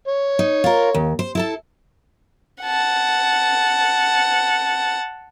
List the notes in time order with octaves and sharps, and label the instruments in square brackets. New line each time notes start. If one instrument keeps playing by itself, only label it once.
[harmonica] C#5
[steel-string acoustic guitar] D#4
F4 A#4
D#2
C5
E4 A4 A5
[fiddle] F#5 A5